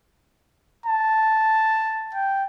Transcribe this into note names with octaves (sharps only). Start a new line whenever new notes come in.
A5
G5